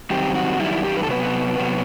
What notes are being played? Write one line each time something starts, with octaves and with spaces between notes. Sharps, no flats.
F#2 D#3 G3 C4 G4
F#4
F#2 D#3 G3 E4
E4
G4
B4
A4
C3 F#3 B3 B4
C3 F#3 B3